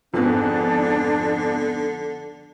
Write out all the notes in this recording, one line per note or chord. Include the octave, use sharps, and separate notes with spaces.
F2 G#2 D3 F3 B3 D4